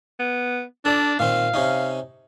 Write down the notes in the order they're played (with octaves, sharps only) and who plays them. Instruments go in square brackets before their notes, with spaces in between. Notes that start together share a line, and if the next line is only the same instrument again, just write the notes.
[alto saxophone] B3
[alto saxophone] D4 [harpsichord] A4 D5
[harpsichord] A#2 D#3 C4 [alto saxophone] F5
[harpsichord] C3 C#4 D#4